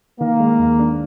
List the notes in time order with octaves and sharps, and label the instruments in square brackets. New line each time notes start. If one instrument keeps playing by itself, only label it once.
[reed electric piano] D#3 [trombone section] A#3
[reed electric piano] G#3
D#2
D4